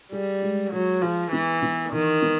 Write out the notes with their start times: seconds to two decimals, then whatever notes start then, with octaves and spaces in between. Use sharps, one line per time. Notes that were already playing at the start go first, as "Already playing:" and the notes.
0.12 G3 G#4
0.42 G#3
0.72 F#3 G#4
1.02 F3 G#4
1.32 E3 B3
1.62 B3
1.92 D#3 E3
2.22 B3